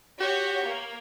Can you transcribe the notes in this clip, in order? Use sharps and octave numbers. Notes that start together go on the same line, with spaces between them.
F#4 G4 C#5
A#3